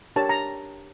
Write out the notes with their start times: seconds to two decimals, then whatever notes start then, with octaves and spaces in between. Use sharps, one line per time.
0.16 D4 G4 A#4 C#5 A5
0.29 A#5